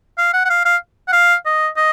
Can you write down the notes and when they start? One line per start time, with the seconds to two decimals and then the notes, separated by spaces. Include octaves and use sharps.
0.18 F5
0.34 F#5
0.45 F#5
0.50 F5
0.66 F5
1.08 F#5
1.13 F5
1.46 D#5
1.77 D#5